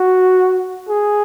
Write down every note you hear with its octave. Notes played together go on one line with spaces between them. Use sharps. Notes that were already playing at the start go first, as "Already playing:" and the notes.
Already playing: F#4
G#4